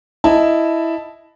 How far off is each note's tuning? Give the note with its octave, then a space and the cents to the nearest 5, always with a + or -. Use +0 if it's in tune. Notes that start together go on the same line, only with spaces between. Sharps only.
E4 +0 D#5 +0 A5 +0